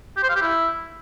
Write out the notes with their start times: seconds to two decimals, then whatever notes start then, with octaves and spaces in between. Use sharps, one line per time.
0.17 G4
0.23 C5
0.29 F5
0.36 G4
0.42 E4